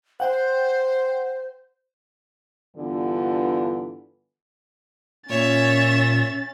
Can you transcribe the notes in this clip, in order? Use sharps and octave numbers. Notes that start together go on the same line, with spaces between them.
C5 F#5 G5
G2 D3 E3 B3 F4
A#2 C#4 C#5 E5 A6